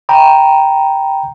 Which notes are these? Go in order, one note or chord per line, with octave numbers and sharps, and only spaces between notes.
G5 A#5 B5